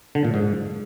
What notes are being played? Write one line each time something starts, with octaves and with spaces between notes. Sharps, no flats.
D3
A#2
G#2